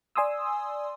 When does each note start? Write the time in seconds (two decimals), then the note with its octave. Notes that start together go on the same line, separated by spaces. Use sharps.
0.16 D5 G#5 C6 D#6 E6